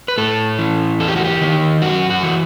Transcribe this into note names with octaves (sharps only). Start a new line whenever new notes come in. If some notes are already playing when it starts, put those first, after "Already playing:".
B4
A2 A4
E3
E2 A4
G4
F#4
G4
D#3
F#2 F#4
F#4
E3